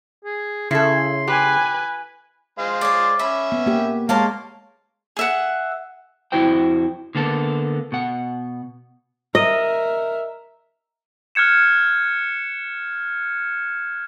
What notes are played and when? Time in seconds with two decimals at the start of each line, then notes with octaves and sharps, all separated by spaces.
0.25 G#4
0.71 C#3 E4 A4 C6
1.27 G4 B4 G#5
2.59 G#3 C5 F5
2.81 C#5 D5
3.19 C#4 E5 B5
3.52 B3
3.66 A#3 G4
4.09 G#3 A#3 C#5 F5 A5 C6
5.17 G#4 E5 F#5
6.32 F2 E4 F#4 C5 G5
7.15 D3 A#3 B3 A4
7.92 B2 F#5
9.35 A#4 D#5 E5
11.35 F6 F#6 G#6 C#7 E7